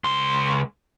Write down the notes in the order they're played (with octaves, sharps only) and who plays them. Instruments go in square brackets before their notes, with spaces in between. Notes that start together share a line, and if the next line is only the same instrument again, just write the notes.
[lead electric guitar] C#2 C6